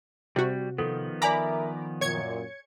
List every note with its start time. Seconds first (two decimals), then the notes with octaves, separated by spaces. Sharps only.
0.36 C3 G3 F#4
0.78 D#3 F3 B3 A4
1.22 A#4 D5 E5 G#5 A#5 B5 D6 E6
2.01 F#2 A#2 C#5 G#6 C#7